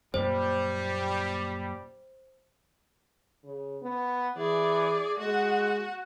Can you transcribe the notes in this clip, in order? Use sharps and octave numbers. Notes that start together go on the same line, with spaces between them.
F#2 A#2 G3 A#3 C5
C#3
B3
E3 G#4 D5
G#3 F#4 F#5